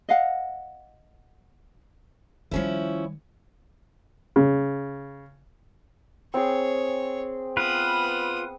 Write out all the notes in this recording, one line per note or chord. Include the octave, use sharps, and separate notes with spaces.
D#5 F5 F#5
D#3 F3 G3 C#4 E4
C#3
C4 G#4 C#5
B3 F4 B4 D#6